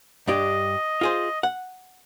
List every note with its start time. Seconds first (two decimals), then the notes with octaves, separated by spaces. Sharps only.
0.28 G2 D4 G4 D#5
1.01 F4 G#4 C5
1.43 F#5